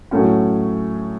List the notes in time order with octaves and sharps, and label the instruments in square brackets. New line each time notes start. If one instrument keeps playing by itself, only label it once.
[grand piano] A2 F#3 A3 C#4 F#4